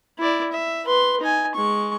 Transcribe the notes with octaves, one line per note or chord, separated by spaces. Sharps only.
E4 D5
E5
B4 C6
D#4 G#5
G#3 C#6